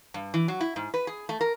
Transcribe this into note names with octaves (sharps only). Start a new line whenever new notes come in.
G2
E3
F#3
E4
G#2
B4
G#4
A3
A#4